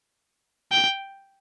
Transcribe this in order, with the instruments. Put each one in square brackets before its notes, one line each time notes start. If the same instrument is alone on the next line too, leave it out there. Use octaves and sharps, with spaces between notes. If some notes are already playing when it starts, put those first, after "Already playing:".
[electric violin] G5